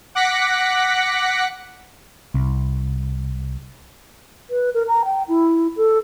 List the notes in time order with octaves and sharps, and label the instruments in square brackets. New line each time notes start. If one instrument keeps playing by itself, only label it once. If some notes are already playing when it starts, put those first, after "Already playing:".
[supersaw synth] F#5 D6 F#6 A#6 B6 C#7
[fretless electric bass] C2
[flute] B4
A#4
A#5
G5
E4
A4